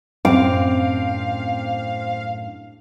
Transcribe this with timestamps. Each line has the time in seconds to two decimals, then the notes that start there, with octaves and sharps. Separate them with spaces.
0.25 F#2 A2 C4 D4 F5 D6